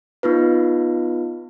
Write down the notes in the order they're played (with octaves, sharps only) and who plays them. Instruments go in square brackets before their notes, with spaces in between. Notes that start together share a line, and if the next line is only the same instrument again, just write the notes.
[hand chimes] B3 D#4 F4 B4